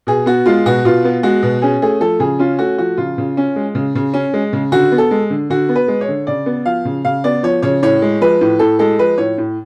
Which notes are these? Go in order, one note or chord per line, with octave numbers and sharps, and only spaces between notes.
B2 G#4
B3 F#4
G#3 F4
B2 F#4
B2 F4
B3
G#3 F#4
B2
C#4 G#4
A3 G#4
F3 A4
C#3 G#4
C#4 F4
A3 F#4
F3 F#4
C#3 F4
C#3
C#4
G#3
C#3
C#3
C#4
G#3
C#3
D3 F#4
B3
A4
G#3
D3
D3 F#4
B3
B4
G#3
C#5
D3
C#3 D5
B3
F3 F5
C#3
C#3 F5
B3 D5
F3 C#5
C#3 C#5
A2 C#5
G#3
F3 B4
A2
A2 A4
G#3 A4
F3 B4
A2 C#5
A2